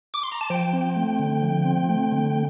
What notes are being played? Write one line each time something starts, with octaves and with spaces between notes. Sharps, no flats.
D6
C6
A#5
A5
F3 G5
C4
A3
D3
F3
C4
A3
D3